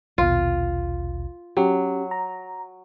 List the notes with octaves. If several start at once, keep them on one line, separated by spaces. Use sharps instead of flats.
A#1 D#2 B2 F4
F#3 C#4 G4
A#5